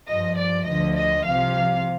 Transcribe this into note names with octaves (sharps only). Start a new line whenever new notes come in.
G2 F3 D#5
D5
D2 D3 F3 D#5
D#5
C2 C3 F3 F5